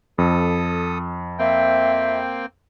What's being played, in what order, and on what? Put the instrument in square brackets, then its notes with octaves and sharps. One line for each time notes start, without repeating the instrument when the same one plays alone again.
[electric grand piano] F2 [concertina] A4 D#6
[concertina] A#3 C4 G5 [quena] E5